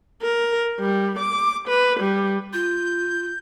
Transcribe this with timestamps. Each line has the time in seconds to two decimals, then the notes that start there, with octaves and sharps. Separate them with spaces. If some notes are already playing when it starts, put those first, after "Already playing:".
0.22 A#4
0.80 G3
1.19 D6
1.68 B4
2.00 G3
2.53 F4 G6